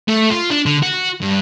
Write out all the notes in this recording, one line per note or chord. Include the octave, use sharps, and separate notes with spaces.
A3
F4
D4
D3
F#4
G2